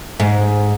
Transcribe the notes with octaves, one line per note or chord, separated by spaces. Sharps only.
G#2